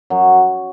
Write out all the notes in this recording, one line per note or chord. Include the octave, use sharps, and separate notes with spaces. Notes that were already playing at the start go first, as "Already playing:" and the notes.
F#2 F#3